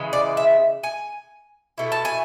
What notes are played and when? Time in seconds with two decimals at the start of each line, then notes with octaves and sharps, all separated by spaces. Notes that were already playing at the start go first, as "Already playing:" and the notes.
Already playing: C#3 E3 G#3
0.13 D5
0.37 E5
0.83 G#5
1.78 B2 A3 E4
1.92 A5
2.05 G#5